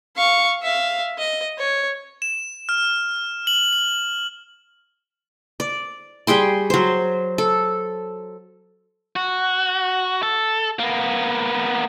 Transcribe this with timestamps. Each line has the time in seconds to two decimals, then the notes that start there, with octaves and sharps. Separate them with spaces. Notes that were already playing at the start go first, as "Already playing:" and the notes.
0.16 F5 C#6
0.62 E5 F5
1.19 D#5
1.58 C#5
2.22 E7
2.69 F6
3.47 F#7
3.73 F#7
5.60 D5
6.27 G3 G#4 G5 C6
6.70 F#3 C5
7.38 A4
9.16 F#4
10.23 A4
10.79 A#3 B3